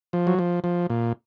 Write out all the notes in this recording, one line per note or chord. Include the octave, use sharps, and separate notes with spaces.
F3
F#3
F3
F3
A#2